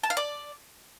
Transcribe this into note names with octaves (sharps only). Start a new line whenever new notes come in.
A5
F5
D5